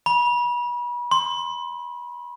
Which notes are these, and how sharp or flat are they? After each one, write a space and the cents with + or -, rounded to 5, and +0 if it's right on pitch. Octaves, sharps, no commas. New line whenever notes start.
B5 -35
C6 +10